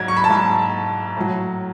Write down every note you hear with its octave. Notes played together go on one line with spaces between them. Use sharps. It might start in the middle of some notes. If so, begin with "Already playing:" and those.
Already playing: G#2 F#3 G#6
C#6
B5
A5
G#2 F#3 B5
A2 F#3